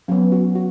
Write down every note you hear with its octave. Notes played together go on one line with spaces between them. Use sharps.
F#3 B3 C#4
F#4
F#4